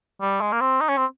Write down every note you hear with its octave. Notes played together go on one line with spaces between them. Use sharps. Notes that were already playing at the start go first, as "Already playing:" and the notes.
G3
G#3
A#3
C4
D#4
C#4
C4